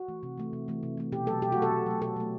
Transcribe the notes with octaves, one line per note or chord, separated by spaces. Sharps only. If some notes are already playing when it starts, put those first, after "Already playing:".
Already playing: F#4
E3 A3
C3
E3 A3
C3
E3 A3
C3
E3 A3
B2 G4
F#3 A3 A4
B2 G4
F#3 A3 F#4
A4
B2
F#3 A3
B2 A4
F#3 A3